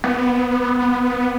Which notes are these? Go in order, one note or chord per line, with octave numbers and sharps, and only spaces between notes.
B3